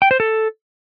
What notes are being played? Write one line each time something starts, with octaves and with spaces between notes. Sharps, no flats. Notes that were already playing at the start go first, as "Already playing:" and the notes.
G5
C5
A4